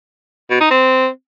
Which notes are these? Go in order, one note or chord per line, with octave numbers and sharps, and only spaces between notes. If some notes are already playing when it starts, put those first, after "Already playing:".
B2
D#4
C4